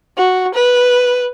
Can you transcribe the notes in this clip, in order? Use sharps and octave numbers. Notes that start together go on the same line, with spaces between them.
F#4
B4